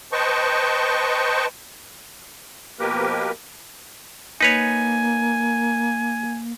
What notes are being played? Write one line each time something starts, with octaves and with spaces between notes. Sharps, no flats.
B4 C5 D#5 G5 A5 C#6
B2 F3 A#3 G4 A#4 B4
A#3 D#4 B4 C#5 G#5